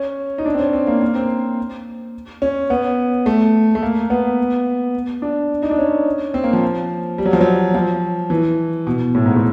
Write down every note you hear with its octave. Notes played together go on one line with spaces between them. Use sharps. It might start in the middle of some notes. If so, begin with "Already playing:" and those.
Already playing: C#4
D#4
D4
C4
C#4
C4
A#3
A#3
C4
C#4
B3
A3
A3
A#3
B3
D4
D#4
D4
C#4
C4
A#3
F3
G3
F#3
F3
F#3
F3
E3
B2
A2
G#2
A2